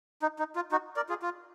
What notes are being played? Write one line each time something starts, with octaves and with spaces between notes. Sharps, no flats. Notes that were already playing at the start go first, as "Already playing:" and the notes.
D#4
D#4
F4
D#4 F#4
A#4 D5
F4 G#4
F4